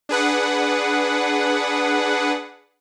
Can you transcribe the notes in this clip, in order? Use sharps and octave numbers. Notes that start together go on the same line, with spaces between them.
D4 G#4 B4 F#5